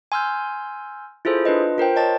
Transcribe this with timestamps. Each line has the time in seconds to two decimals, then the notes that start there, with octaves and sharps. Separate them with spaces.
0.12 G#5 C6 E6 F6 G6
1.25 E4 F4 G#4 A4 C5
1.45 D4 F4 B4 D#5
1.78 F4 A#4 C5 G5
1.96 C#5 D#5 A5 A6